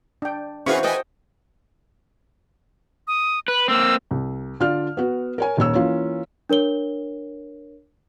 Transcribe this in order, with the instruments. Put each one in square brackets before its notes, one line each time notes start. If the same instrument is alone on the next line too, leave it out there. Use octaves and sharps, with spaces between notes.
[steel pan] D4 G5
[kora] E3 [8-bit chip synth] C#4 G#4 B4 [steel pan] F#4 F5 C#6 [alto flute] C5
[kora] A4 D#5 G5 [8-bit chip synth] B4 G#5
[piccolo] D#6
[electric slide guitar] B4 [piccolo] F#6
[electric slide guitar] A#3 C4 [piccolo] E6
[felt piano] C2
D3 F4 D5 F6
B3 F#4
A#4 C#5 G#5
D#1 D#2 C#5 E6
E3 A#3 C#4 F4
[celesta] D4 A#4 C#5 G7